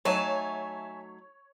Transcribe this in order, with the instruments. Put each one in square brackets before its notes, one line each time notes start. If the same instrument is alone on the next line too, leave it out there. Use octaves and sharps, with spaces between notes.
[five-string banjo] F#3 A3 D#4 [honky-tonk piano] C#5 [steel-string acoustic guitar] E5 G#5 A5